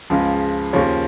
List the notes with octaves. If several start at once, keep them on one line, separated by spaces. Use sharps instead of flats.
C#2 C#3 F3
D#2 C#3 F3 C#5